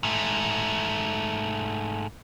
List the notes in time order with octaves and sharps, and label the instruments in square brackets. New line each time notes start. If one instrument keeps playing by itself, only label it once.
[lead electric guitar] G#2 A3